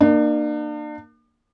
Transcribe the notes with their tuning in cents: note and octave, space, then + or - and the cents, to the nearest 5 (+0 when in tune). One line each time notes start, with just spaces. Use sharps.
A#3 +0 D4 +40